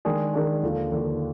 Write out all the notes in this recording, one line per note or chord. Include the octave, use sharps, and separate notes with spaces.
D#3 G#3 D4 G#4
D#3 G#3 D4 G#4
D#2 D3 F3
D#2 D3 F3